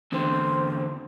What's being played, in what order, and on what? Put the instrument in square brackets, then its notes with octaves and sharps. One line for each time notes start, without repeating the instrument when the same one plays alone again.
[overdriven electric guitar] E2 D3 [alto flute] C4